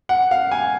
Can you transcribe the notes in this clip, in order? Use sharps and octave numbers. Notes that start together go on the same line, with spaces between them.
F#5
F5
G#5